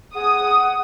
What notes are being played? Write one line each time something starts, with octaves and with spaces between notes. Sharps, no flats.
G#4 F#5 D#6